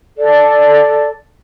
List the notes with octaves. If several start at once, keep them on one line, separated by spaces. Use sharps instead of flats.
A4 D5